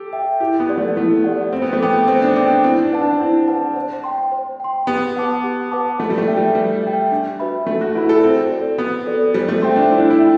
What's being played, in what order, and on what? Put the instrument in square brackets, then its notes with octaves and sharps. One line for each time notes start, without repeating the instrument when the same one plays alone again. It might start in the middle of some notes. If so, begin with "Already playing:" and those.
Already playing: [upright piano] G4 A4
[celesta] E5 G5
[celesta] E4 [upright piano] G4
[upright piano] B3
[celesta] G4 D5 F#5
[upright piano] A3
[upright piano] A3 [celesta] E4
[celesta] G4 D5 F#5
[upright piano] C4 [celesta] C5
[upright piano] B3
A3
[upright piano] B3 [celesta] G5 D6
[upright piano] C4 [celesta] C5
[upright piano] D4
[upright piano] C4 [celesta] G5 D6
[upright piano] C4 [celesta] E4
[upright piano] D4
[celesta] B4 F#5 A5
[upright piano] D4
[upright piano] C4 [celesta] E4
[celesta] B4 F#5 A5
C5
G5 C6
C5
G5 C6
[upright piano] B3 [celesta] G4
[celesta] B4 F#5 A5 D6
G4
B4 F#5 A5 D6
[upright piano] A3 [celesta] B4
[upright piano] G3
A3
[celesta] E5 G5
[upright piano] G3
[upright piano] G3 [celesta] B4
[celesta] E5 G5
D4
F#4 B4 E5 B5
[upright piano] A3 [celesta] D4
[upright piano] F#4
[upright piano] E4 [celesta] F#4 B4 E5 B5
[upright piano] A4
[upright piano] C4 [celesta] F#4
[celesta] A4 D5
[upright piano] B3 [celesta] F#4
[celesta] A4 D5
[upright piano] G3 [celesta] C5
[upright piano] A3
[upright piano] C4 [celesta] E5 G5 C6
[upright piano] D4
[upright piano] E4 [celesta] C5
[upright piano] D4
E4
[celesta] E5 G5